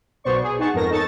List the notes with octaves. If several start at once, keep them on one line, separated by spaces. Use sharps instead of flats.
B1 B2 B3 C5 D5 C#6
G#4
D#4 G#4 F#5 A5 C#6
F2 G#2 B3 A#4 C#5 A#6
D#4 A4 A5 C#6 A6